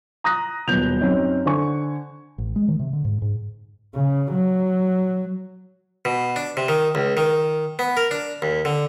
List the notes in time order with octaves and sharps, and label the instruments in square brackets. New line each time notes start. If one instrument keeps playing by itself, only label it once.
[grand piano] A#5 D#6 F#6 A#6
D#1 B2 F#3 B3 G6 F7
F#2 C4 C#4 D#4
D3 C5 G#5 C#6
[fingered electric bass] A1
G#3
D#3
C3
D3
G#2
G#2
[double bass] C#3
F#3
[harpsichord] B2
D4
C3
D#3
C#2
D#3
B3
A#4
D4
D#2
D3